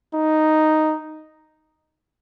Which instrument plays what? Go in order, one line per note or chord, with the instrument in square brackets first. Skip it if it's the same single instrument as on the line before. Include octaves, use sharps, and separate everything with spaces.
[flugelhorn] D#4